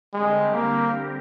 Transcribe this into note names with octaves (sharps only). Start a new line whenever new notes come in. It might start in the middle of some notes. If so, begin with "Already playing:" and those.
D3 G3 G#3 C4 G4 A#4
A#3